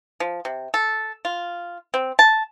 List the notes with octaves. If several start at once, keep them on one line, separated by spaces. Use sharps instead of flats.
F3
C3
A4
F4
C4
A5